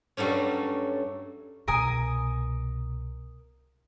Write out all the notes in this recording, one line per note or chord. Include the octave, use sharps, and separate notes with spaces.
G2 F#3 G3 A3 C#4
C2 B2 A#4 G#5 D#6